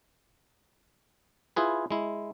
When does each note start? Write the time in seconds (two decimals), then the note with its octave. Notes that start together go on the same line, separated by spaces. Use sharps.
1.56 E4 F4 G#4 B4
1.91 G#3 E4